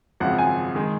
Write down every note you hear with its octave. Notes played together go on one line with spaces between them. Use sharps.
G#1 F#2 C#3 F3 C4 F#5
G#5
D#3 G#3